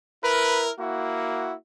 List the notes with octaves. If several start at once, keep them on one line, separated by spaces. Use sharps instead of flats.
E4 A#4 B4
A#3 E4 F#4